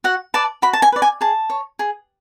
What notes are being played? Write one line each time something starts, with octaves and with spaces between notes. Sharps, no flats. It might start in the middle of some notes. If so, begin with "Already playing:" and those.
F#4 F#5
B4 D5 A5
F#4 B5
A5
G#5
B4 D5
G#5
G#4 A5
C#5
G#4